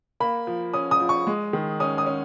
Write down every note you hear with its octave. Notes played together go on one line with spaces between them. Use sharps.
A#3 B5
F3
C#4 D#6
D#6
F3
C#6
G#3
D#3
C#4 D#6
D#6
C#4